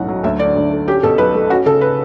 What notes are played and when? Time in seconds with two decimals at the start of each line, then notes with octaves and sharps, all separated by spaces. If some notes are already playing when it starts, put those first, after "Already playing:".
Already playing: B1 A2 C#4 F#5
0.08 F#3
0.23 D2 E5
0.39 D3 D5
0.56 D2
0.71 A3
0.88 C#4 G4
1.03 B2 A4
1.18 B1 B4
1.34 A3
1.50 C#4 F#4
1.66 C#3 A4
1.81 B4